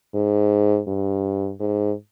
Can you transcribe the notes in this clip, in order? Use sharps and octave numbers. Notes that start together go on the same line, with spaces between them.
G#2
G2
G#2